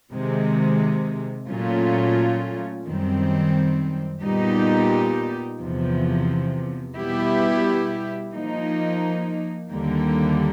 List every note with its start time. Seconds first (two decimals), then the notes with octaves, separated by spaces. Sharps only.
0.11 C3 D#3 G#3
1.48 A#2 F#3 A3 C#4 F4
2.86 F#2 D#3 G3 C4
4.22 A#2 G3 B3 D#4 G4
5.60 E2 C3 F3
6.97 B2 G3 B3 E4 G4
8.33 F3 A#3 D#4
9.71 D#2 D3 G3 A#3